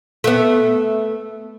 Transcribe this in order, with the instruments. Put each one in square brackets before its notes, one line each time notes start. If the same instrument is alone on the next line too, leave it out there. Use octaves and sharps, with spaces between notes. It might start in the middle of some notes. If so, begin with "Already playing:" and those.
[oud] A3 B3